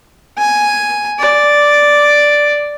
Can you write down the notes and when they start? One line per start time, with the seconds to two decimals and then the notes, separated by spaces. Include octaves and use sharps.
0.38 G#5
1.19 D5